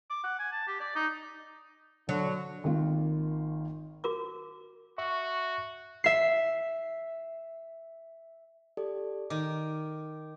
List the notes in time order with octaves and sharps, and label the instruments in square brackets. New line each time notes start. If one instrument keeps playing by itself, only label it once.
[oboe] D6
F#5
G#5
A5
G4
D5
D#4
[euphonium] D3 [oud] F#3
[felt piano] G#1 D#3 A#3 F4
[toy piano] F#4 A#4 D6
[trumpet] F#4 [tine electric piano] E5 C#6
[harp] E5 C7
[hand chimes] G4 A4 D5
[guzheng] D#3 [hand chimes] D6